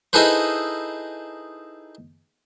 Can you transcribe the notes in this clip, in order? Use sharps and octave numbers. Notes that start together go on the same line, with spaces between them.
D#4 E4 G#4 A4 B4 C5